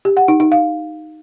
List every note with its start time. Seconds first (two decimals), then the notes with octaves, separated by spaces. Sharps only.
0.05 G4
0.17 F#5
0.28 D#4
0.40 D#4
0.52 F5